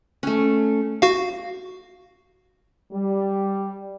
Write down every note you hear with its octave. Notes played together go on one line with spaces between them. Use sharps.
A3 C#4
F#4 F5
G3